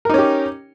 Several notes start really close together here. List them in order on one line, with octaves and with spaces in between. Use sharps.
A#4 D#4 C#4 G4